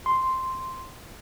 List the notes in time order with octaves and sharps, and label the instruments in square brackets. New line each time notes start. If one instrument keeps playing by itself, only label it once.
[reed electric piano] C6